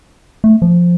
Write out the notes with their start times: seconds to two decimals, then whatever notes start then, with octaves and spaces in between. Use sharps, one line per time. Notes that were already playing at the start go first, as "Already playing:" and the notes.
0.44 A3
0.62 F3